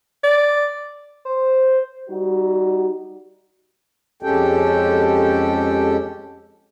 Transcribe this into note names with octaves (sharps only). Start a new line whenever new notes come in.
D5
C5
G3 D#4 F#4
F2 G#3 C#4 G4 A4 G5